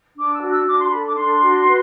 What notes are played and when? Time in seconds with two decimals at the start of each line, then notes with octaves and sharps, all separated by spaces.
0.17 D4 D6
0.33 E6
0.42 F#4
0.50 E6
0.67 D4 D6
0.80 C6
0.91 A4 B5
1.04 D6
1.17 D4 C6
1.42 F#4
1.67 B4